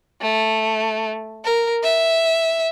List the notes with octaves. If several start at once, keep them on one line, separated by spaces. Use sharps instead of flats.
A3
A#4
E5